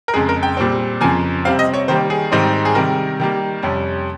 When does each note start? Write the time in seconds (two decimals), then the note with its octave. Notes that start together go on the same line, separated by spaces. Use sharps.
0.08 A#4
0.13 F2 C#3 G#3 G#4
0.29 A#4
0.43 G5
0.57 A#2 G3 C4
1.01 F2 C#3 F3 A#3 G#5
1.45 C3 G3 C4 F5
1.59 D#5
1.74 C#5
1.88 D#3 G3 A#3 C5
2.10 G#4
2.32 G#2 D#3 G3 C4 D#4
2.65 G#4
2.75 C3 D#3 G3 A#4
3.20 D#3 G3 A#3
3.62 F2 C3 G3 C#4